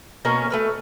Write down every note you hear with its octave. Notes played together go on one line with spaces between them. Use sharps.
B2 A#3 C#4 A#4
A3 B4 F5